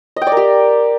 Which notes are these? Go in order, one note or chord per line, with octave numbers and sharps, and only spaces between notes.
D#5
G5
D5
A#4
G4